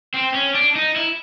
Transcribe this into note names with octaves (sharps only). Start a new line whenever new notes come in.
C4
C#4
D4
D#4
E4